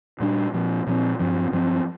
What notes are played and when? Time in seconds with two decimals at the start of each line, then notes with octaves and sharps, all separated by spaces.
0.20 A#2 G3 D4
0.54 A#2 F3 C4
0.87 A#2 F3 C4
1.20 G2 F3 C4
1.52 G2 F3 C4